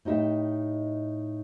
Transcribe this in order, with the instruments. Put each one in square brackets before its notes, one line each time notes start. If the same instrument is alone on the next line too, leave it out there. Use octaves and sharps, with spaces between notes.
[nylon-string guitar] A2 D#4 G4 D#5 E5